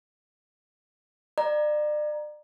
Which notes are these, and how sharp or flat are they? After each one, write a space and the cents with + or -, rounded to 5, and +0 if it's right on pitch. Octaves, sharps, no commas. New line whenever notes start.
D5 +35 A#5 +10